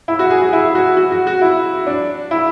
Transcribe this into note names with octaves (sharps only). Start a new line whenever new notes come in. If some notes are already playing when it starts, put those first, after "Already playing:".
E4
F#4
G#4
F#4
E4
F#4
F#4
F#4
F#4
E4
D4
E4